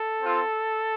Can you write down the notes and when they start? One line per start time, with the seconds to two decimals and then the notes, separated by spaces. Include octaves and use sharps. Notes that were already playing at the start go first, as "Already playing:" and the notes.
Already playing: A4
0.20 C4 F4